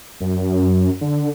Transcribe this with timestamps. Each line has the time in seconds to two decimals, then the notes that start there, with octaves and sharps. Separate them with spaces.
0.21 F#2
1.01 D3